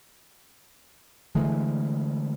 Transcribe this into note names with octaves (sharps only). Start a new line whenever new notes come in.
D3 E3 G#3 A3